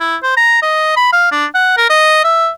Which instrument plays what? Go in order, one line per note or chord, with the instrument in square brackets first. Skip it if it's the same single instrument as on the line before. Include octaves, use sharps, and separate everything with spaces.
[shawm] E4
C5
A#5
D#5
B5
F5
D4
F#5
A#4
D#5
E5